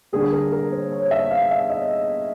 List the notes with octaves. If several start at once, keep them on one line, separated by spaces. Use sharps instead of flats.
D3 G3 A#3 G#4
A#4
A#4
C5
C#5
E5
F5
E5
D#5